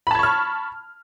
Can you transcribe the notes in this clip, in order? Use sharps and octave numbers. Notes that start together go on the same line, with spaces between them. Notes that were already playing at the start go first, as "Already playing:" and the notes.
A5 B5 C#6 F6 G#6